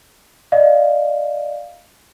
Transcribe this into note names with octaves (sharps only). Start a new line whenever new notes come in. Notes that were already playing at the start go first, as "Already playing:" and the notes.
D5 D#5 F5